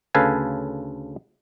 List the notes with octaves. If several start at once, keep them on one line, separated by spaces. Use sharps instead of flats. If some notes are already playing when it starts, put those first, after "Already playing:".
D2 C#3 A4 B4 F5 G#5